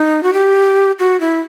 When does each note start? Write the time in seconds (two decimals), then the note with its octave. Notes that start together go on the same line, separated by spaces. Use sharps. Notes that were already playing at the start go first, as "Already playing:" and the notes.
Already playing: D#4
0.23 F#4
0.33 G4
0.99 F#4
1.20 E4